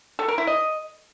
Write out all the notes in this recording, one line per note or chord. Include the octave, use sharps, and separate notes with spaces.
A4
A#4
E4
D#5